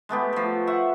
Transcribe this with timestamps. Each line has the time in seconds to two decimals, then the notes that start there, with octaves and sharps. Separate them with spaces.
0.09 G#3 A3 B3 G4
0.33 F3 A3
0.67 E5 F#5 C#6